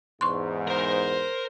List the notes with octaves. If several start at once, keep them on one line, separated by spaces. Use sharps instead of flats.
E2 G#2 C6 C#6
A#4 C5 A#5